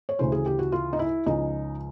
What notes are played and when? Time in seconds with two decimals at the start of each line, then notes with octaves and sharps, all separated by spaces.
0.09 C#5
0.19 D2 C#3 E3 C5
0.32 G#4
0.46 G4
0.59 F#4
0.72 F4
0.93 D#4
0.99 E4
1.26 C#2 C#3 F3 D#4